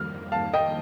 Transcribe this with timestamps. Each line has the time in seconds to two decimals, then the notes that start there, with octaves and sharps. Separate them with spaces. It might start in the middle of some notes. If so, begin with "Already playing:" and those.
Already playing: F2 D#3 G3 A#3 F6
0.32 F5 A5
0.53 D#5 G5